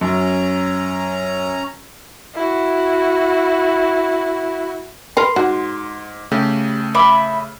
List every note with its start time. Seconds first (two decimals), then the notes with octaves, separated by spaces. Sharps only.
0.01 F#2 C#4 A#5
2.35 E4 F#4
5.17 A#4 B4 C6
5.36 G#2 F#4
6.32 C#3 A3 G4
6.95 E5 B5 D6